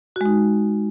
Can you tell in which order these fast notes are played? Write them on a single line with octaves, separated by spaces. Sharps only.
F#4 G#3 D#4